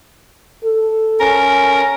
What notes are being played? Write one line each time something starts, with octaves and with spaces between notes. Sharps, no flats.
A4
C#4 A#4